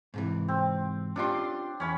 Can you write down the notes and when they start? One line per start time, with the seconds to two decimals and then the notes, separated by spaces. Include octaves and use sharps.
0.14 G#2 C3 E3
0.48 C4
1.16 C#4 D4 F4 G4 C6
1.80 E2 C#4 C#5 B5